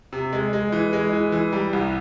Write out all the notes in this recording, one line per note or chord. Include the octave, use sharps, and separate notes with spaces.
C3
G#3
G#3
E3
G#3
E3
E3
G3
C2